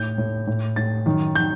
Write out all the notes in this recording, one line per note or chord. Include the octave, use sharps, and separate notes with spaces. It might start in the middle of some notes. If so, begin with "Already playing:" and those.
Already playing: A2 G6
A2
A2
A2 A6
F#2 D#3
D#3 G6